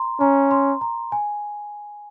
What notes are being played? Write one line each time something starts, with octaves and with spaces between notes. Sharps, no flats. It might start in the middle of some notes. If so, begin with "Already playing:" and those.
Already playing: A#5 C6
C#4 A#5
C6
A#5
G#5